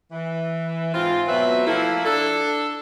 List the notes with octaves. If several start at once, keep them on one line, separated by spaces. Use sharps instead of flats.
E3
G#2 C4 F4
B2 F#3 C4 B4 E5
F3 A3 A#3 E4
D4 A4